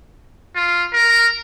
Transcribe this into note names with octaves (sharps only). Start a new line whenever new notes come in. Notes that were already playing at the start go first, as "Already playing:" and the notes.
F4
A#4